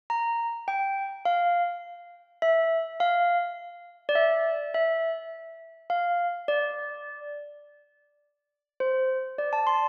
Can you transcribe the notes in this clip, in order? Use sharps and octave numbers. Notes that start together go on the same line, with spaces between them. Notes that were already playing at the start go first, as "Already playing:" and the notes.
A#5
G5
F5
E5
F5
D5
E5
E5
F5
D5
C5
D5
A5
C6